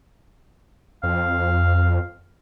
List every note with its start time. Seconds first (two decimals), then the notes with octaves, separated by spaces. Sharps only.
1.03 F2 F5